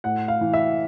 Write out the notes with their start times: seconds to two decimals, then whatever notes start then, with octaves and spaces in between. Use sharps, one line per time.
0.04 A2 F#5
0.28 F5
0.41 E3
0.54 E5